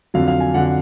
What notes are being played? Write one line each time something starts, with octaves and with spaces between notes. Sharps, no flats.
F2 D3 F#3 F5
F5
G#5
F2 D3 F#3 F#5